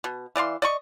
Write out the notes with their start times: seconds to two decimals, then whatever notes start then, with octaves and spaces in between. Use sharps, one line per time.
0.04 B2
0.36 E3 D5 F5 C6
0.62 D5 D#5 C#6